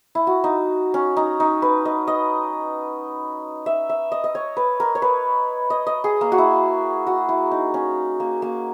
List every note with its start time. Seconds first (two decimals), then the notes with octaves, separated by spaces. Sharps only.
0.15 E4
0.27 F#4
0.44 D#4
0.94 C#4
1.17 D#4
1.40 D#4
1.62 B4
1.85 D#5
2.07 D#5
3.66 E5
3.89 E5
4.12 D#5
4.24 D#5
4.35 C#5
4.57 B4
4.80 A#4
4.95 C#5
5.02 B4
5.70 D#5
5.87 D#5
6.04 G#4
6.21 A#3
6.32 F#4
6.38 E4
7.07 F#4
7.29 E4
7.51 D#4
7.74 C#4
8.20 A#3
8.42 A#3